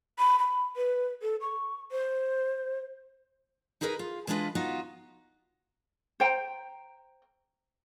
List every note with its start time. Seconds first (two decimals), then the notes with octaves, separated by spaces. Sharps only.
0.19 B5
0.39 B5
0.76 B4
1.22 A4
1.41 C#6
1.92 C5
3.81 D#4 E4 G#4 A#4 B4 D#5
3.99 F4
4.27 E3 G#3 D4 F4 B4 D#5
4.55 B3 D#4 F4 F#4
6.20 C5 G5 A#5